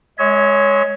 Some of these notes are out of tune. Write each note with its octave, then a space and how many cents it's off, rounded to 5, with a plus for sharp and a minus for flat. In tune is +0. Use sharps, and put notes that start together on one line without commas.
G#3 +0 C#5 +5 E5 -45